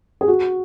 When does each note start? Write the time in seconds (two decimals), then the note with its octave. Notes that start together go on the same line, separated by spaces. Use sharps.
0.21 G#4
0.28 F#4